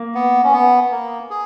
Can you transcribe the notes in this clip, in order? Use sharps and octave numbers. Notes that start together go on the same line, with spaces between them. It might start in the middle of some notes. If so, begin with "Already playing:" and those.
Already playing: A#3
B3
C#4
B3
A#3
G#4